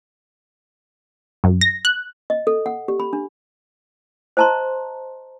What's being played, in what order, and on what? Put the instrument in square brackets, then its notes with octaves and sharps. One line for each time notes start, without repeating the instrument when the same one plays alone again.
[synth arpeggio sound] F#2
A#6
F#6
[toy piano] D#5
A4
F#5
G4
B5
D4
C5 D#5 A5 A#5 C6